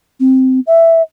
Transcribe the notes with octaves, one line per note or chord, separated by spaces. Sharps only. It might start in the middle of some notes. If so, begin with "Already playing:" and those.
C4
E5